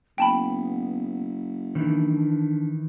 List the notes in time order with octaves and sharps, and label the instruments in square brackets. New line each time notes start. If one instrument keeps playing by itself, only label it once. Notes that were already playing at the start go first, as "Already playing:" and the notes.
[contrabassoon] F#1 [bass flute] B3 [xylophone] G5 A5 B5
[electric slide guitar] D#3 E3 [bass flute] D4